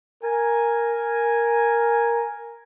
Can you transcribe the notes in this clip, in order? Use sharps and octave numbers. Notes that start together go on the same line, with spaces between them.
A#4 G#5